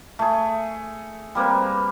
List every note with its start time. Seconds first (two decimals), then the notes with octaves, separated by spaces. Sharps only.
0.19 A3 G#4
1.35 G3 A#3 C4 B4